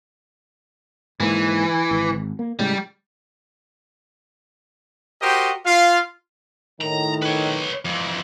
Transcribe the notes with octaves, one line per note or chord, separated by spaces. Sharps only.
G#2 E3 A#3
G#1
A#3
A2 C#3 G3 G#3
F#4 G4 A#4 C5 D#5 G5
F4 F5
A2 D#3 A#5
B4 C#5
F2 E3